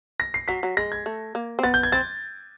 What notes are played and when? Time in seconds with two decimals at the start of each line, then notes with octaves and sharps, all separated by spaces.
0.20 A#6
0.34 C7
0.48 F#3 B6
0.63 F#3
0.77 G#3 A#6
0.92 G#6
1.06 A3
1.35 A#3
1.59 C4
1.63 B3 A6
1.74 G6
1.83 G#6
1.92 C4 A6